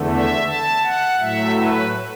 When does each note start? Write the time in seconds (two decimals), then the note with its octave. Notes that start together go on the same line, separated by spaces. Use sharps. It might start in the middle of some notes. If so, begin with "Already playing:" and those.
Already playing: E2 D3 A3
0.11 E5
0.47 A5
0.83 F#5
1.19 A2 F#3 A3 E5
1.56 B4